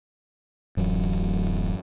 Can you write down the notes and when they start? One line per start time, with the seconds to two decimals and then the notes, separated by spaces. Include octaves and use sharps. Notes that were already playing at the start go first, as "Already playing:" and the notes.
0.77 D1 F#2 E3 F#3